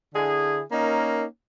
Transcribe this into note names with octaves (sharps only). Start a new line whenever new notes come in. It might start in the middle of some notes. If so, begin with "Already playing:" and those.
D3 E4 G#4
A#3 C#4 D#4 A#4